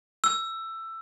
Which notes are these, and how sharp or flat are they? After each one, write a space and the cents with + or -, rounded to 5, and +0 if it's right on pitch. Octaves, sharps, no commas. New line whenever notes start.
E6 +15